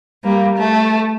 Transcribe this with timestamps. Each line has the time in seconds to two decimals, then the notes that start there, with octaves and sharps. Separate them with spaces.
0.23 G3 A#3
0.58 A3